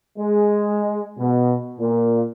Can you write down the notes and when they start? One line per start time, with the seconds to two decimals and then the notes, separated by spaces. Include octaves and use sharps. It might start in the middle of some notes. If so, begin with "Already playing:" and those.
0.18 G#3
1.18 B2
1.80 A#2